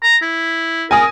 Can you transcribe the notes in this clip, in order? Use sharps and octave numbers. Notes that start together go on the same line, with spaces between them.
A#5
E4
A#4 G#5 D#6